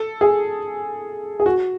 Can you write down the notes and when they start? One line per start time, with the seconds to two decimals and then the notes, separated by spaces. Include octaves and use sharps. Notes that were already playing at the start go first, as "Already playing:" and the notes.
Already playing: A4
0.21 G#4
1.40 G#4
1.46 F#4